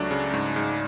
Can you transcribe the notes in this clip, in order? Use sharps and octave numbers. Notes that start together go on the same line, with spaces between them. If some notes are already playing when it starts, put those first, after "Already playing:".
Already playing: C#2 F#3 A3 D4 D5
C#3
G#2
G#2